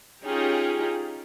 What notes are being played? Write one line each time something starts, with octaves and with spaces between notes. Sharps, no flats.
C#4 D#4 F4 G4 G#4